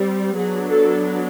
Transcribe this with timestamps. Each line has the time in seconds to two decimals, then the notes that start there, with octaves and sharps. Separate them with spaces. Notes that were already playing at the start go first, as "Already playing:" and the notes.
Already playing: G3 C4
0.36 F#3 B3 D4 G#4
0.69 A4